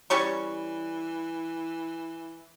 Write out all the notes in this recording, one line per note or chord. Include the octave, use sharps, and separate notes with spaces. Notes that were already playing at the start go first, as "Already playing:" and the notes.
E3 G3 C#4 C#6